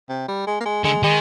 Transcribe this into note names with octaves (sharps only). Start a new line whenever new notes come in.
C3
G3
G#3
A#3
G#3
D3 G#3
D#3 G#3